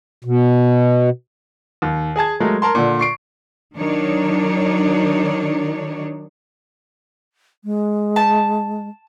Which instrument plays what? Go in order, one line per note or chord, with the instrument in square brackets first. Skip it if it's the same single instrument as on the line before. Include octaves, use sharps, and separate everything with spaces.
[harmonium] B2
[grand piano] D#2
G#4 G#5 A5 G#6
F#3 G#3 A3 A#4
A#4 A5 C6
A#2 D3
C#6 C7 D7
[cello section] D#3 F#3 D4 D#4 C#5
[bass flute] G#3
[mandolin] A5